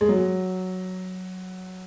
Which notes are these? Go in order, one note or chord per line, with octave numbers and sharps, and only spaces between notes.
G#3
F#3